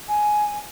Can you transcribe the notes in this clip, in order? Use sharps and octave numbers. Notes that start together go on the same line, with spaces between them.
G#5